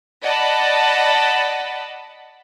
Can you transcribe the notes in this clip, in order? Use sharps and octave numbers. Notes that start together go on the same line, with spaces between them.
D5 D#5 F#5 A5 B5